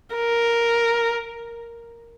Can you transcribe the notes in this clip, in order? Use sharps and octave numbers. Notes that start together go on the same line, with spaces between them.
A#4